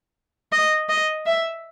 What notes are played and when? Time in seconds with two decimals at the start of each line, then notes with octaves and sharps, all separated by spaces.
0.52 D#5
0.89 D#5
1.26 E5